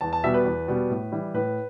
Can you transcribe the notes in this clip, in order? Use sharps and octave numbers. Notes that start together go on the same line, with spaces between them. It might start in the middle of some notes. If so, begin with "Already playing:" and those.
E2 A5
A5
B2 G3 B3 E5
B4
E2
B2 G3 B3
A2
E3 G3 E4
A2 B4